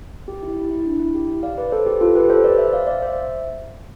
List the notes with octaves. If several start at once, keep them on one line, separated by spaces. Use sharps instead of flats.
G4
E4
E4
E4
D4
E4
G4
D5 F5
B4 D5
A4 C5
G4 B4
F4 A4
G4 B4
A4 C5
B4 D5
C5 E5
D5 F5
D5 F5
C5 E5